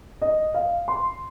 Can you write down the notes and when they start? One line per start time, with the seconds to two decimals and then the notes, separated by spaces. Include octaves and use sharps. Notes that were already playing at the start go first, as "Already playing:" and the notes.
0.22 D#5
0.54 F5
0.88 C6